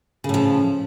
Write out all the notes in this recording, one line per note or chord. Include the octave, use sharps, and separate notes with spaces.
A2 C#3 F3